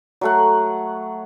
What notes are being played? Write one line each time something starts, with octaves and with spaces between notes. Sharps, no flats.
F#3 A3 F#5